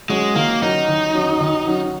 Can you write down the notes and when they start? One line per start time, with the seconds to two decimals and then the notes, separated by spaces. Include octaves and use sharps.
0.09 F#3 G#3 C#4 F#4
0.35 D#3 A#3
0.62 F#3 C#4 D#4 F#4
0.88 D#3
1.15 F#3 C#4 F#4
1.40 D#3
1.67 F#3 C#4 F#4